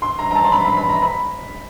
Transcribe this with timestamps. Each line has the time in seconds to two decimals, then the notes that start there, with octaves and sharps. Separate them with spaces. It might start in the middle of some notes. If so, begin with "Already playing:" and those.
0.02 C6
0.19 A#5
0.31 A#5
0.35 A5
0.45 C6
0.52 B5
0.65 B5
0.77 B5
0.89 A#5
1.02 B5